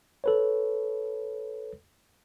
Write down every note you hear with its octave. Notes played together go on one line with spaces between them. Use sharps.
A4 B4 C#5